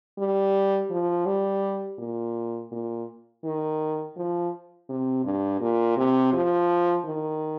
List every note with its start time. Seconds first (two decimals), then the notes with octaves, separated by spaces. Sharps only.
0.18 G3
0.91 F3
1.26 G3
1.99 A#2
2.72 A#2
3.44 D#3
4.17 F3
4.89 C3
5.25 G2
5.61 A#2
5.97 C3
6.33 F3
7.06 D#3